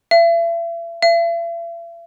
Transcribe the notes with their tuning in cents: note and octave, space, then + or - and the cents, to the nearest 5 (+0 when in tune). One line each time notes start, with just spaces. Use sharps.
E5 +40
E5 +45